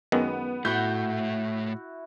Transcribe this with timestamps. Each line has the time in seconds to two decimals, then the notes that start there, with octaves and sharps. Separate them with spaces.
0.12 F#2 D#3 G#3 B3
0.65 A2 A3 E4 F#4 G6